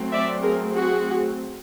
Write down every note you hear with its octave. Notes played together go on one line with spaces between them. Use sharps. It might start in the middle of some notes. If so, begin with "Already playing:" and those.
Already playing: F#3 A3 C4
D5 E5
G#4 A#4
F#4 G#4